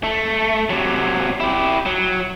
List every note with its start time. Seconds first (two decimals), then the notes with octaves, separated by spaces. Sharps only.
0.04 A3
0.70 C3 F#3
1.40 E4 G4
1.86 F#3